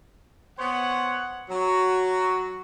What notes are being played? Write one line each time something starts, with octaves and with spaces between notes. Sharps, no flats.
B3 C5 C#5 F#5
F#3 F#4